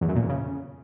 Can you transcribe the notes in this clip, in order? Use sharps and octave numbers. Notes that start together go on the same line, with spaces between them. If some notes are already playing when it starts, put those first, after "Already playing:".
E2
F#2
A#2
F2
C#3